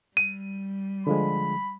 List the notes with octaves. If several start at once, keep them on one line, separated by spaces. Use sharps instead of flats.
G3 D#7
D3 F3 G#3 B5